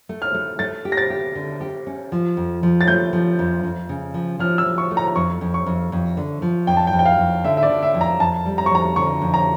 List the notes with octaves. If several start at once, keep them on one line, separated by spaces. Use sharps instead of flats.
A3
F6
A3
A3 A6
G4
A#6
A6
G4
D3
G4
C#4
F3
F2
F3
A6
A3 G6
F3
F2
F2
C#3
F3
F3 F6
E6
F3
C#6
A3
A#5
A#5
F2 C#6
F2
C#6
F2
F2
D3
F3
F2 G5
A5
G5
F2
G5
F5
F2
D3 E5
E5
D5
D3
E5
F2
A#5
F2 A5
G3
A#5
C#6
F2 A#5
D3 C#6
F2
A#5